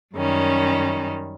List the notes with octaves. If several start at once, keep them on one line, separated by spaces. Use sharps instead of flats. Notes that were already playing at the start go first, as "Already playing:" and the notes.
F#2 D#3 G3 C#4